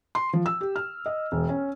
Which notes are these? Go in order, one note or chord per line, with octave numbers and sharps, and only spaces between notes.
C6
F3
E6
G4
F6
D#5
E1
C#4